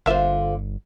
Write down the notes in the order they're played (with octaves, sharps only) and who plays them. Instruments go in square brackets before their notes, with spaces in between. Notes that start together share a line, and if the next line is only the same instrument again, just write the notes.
[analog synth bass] G1 [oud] D3 F4 C5 [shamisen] A#3 E5